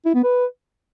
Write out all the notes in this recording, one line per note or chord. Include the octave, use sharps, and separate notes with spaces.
E4
B3
B4